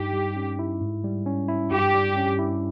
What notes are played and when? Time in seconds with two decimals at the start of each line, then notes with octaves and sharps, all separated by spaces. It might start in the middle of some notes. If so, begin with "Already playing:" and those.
Already playing: G2 D#4 G4
0.13 G3
0.36 C#4
0.59 E4
0.81 G#2
1.04 G3
1.26 C#4
1.48 E4
1.71 G2 G4
1.94 G3
2.17 C#4
2.39 E4